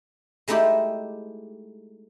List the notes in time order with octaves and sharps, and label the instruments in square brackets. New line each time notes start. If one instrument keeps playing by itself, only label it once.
[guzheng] G#3 A3 D#4 E4 G4 C5